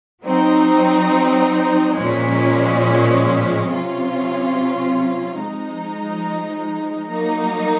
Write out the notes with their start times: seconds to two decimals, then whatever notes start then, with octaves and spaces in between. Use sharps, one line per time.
0.23 F#3 C4 D#4
1.95 A#2 F3 G#3 C#4
3.66 C3 F#3 C#4 F4
5.39 F3 G#3 D#4
7.09 F#3 A#3 D#4